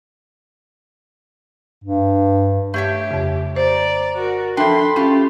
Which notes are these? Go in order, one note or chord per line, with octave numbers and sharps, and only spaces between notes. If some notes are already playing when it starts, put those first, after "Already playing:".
G2
A3 G4 C#5 E5
F2 C#3
C5 D5 A#5
F#4 A#4
F3 D4 A4 E5 G5 B5 C6
A3 C#4 F4 G4